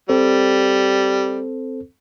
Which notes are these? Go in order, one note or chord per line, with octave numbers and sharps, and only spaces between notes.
G3 C4 A4 C5